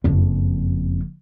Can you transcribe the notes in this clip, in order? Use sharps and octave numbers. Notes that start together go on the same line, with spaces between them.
F#1 F2